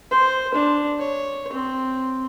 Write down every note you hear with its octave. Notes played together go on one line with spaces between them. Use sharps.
C5
D4
C#5
C4